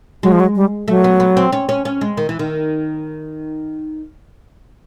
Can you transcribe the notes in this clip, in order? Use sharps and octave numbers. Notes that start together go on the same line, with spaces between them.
F#3 G#3
F3
F#3
G3
F#3 A3
B3
B3
C4
C#4
C#4
C#4
G#3
D#3
E3
D#3